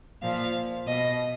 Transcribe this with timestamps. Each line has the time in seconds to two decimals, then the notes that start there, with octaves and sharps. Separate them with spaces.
0.22 A#2 F3 F5
0.87 B2 D#5